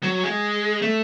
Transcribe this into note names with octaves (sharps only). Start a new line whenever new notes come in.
F#3
G#3
A3